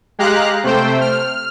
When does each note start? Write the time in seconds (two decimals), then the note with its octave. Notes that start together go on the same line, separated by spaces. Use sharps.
0.19 G#3 G4 F5 A#5 F#6
0.63 C3 A3 C5 G5
1.01 F6